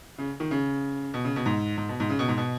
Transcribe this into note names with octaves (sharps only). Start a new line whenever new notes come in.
C#3
D#3
C#3
B2
C#3
B2
G#2
G#2
B2
G#2
C#3
B2
G#2
B2